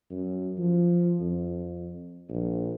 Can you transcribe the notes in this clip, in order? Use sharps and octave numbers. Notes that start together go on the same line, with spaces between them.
F#2
F3
F2
A#1